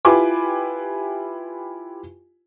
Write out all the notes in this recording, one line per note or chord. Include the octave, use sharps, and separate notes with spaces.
E4 F4 G4 B4 G#5 D6